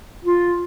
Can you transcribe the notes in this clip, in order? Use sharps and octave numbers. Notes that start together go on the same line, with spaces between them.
F4